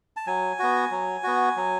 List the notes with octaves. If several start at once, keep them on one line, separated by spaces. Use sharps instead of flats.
A5
F#3 G#5
B3 F#4
F#3
B3 F#4
F#3